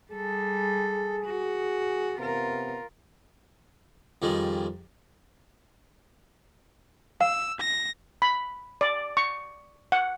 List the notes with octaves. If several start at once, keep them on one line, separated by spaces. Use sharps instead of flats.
G3 G#4 A4
F#4
C3 B3 F4 A#4
F2 D#3 G3 G#3
F5 E6
A#6
B5
D5
C#6
F#5